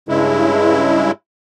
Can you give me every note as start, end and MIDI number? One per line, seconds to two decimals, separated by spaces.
0.09 1.11 43
0.09 1.11 49
0.09 1.11 56
0.09 1.11 64